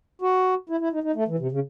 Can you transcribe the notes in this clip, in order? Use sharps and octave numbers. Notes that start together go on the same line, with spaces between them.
F#4
E4
E4
D#4
D#4
A3
E3
C3
C#3